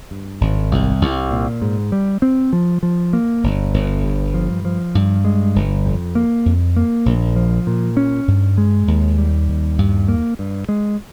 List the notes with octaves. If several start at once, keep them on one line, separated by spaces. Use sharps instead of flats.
G2
G#1
C2
C2
A#2
G#2
G3
C4
F3
F3
A#3
G1
G1
G2
F3
F3
G2
G#3
G1
F2
A#3
F2
A#3
A#1
F3
A#2
C#4
G2
G#3
D#2
G3
D#2
G2
A#3
G2
G#3